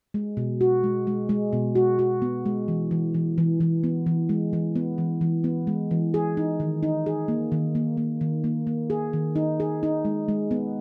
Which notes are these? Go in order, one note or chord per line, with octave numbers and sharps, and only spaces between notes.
G#3
B2
F#4
G#3
G#3
G#3
B2
F#4
F#4
B3
G#3
E3
E3
E3
E3
E3
B3
E3
G#3
E3
B3
E3
E3
B3
G#3
E3
G#4
D#4
D#3
D#4
G#4
A#3
D#3
A#3
A#3
D#3
A#3
A#3
G#4
D#3
D#4
G#4
D#4
G#3
G#3
B3